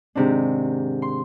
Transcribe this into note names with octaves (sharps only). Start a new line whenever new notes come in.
G#2 C3 D#3 D4
C6